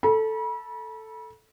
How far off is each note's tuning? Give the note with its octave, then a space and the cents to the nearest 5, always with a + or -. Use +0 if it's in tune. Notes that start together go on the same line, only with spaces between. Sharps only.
A4 +0 B5 -40